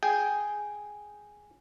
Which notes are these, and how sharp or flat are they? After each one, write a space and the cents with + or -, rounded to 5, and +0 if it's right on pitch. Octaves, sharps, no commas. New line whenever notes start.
G#4 +0 G5 -5